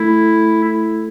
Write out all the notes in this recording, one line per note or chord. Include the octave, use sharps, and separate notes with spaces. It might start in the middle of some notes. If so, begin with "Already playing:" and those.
Already playing: A3 E4
E4